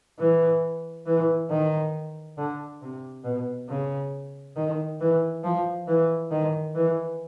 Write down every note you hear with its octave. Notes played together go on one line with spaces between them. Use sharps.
E3
E3
D#3
D3
C3
B2
C#3
D#3
E3
F3
E3
D#3
E3